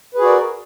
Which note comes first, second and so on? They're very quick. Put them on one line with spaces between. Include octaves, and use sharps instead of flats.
B4 G#4 F#4 D5 A#4